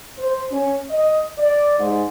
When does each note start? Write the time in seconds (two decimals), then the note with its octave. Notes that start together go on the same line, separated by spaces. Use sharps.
0.18 C5
0.50 C#4
0.89 D#5
1.37 D5
1.78 G#2